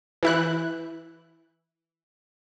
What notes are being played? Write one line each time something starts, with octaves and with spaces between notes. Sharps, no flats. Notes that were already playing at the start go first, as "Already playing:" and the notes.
E3 E4 F#6